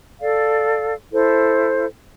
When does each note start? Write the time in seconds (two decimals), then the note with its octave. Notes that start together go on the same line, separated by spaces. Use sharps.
0.19 A4 D5 F5
1.12 E4 A4 C5